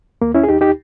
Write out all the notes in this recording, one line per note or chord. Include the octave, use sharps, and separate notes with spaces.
D#2 A#3
C#4 E4
G#4
D#2 D#4 G4
D#4 G4